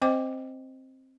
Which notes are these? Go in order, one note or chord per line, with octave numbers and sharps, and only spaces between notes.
C4 C5 D#5 G5 D6